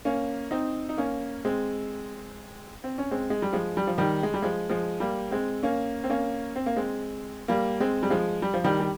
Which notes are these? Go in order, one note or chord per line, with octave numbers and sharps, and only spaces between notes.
A#3 C#4
C4 D#4
D#4
A#3 C#4
G#3 C4
C4
C#4
G#3 C4
G#3
G3
F3 G#3
G3
F3
D#3 G3
G#3
G3
F3 G#3
F3 G#3
G3 A#3
G#3 C4
A#3 C#4
C4
A#3 C#4
C4
A#3
G#3 C4
G3 A#3
G#3 C4
G3
F3 G#3
G3
F3
D#3 G3
G3